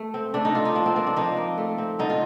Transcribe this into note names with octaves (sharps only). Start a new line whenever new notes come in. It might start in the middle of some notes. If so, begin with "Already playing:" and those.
Already playing: A3
C4
A3 D4
D#4
C4 F4
D#4
F3 D4
C4
A#3 C4
D4
F3 D#4
A#3
A3
C4
D3 D#4
F4